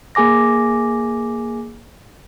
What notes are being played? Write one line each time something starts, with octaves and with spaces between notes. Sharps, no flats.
A#3 G#4 G#5 D6 A#6